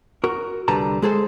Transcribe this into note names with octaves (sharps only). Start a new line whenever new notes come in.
F#4 A#4
C2 D3 G3 B4 A5 A#5
G#3 G#4 A4 C5